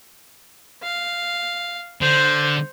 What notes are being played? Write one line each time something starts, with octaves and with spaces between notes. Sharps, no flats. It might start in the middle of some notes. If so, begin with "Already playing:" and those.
F5
D3 C5